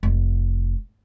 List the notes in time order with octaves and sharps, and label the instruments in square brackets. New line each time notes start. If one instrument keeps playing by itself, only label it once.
[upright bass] F1